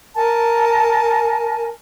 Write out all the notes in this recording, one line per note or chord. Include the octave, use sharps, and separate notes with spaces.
A#4 G#5 A5